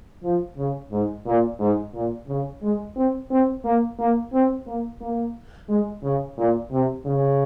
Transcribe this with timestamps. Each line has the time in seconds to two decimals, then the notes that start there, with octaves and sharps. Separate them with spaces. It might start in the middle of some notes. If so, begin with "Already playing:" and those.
0.23 F3
0.57 C#3
0.92 G#2
1.26 A#2
1.60 G#2
1.94 A#2
2.28 C#3
2.63 G#3
2.96 C4
3.31 C4
3.65 A#3
3.99 A#3
4.33 C4
4.67 A#3
5.01 A#3
5.69 G#3
6.03 C#3
6.37 A#2
6.72 C3
7.05 C#3